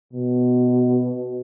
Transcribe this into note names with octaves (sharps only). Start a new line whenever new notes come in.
B2